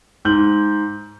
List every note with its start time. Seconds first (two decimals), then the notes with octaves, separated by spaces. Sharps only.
0.25 G#2 G6 F#7